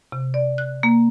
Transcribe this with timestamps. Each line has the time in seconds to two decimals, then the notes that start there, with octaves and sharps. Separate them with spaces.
0.12 C3
0.34 D5
0.58 F#6
0.83 A#3